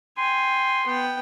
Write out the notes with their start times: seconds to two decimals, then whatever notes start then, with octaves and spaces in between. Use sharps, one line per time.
0.18 G5 G#5 C6
0.86 B3 G5